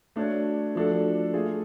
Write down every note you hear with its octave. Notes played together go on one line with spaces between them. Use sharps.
A3 D4 F#4 C#5
F3 A3 D4 F#4 A4
A3 F4 G#4